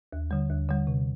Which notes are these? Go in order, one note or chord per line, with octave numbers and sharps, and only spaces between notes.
D#2
D3 G3
D#2
D3 G3
C3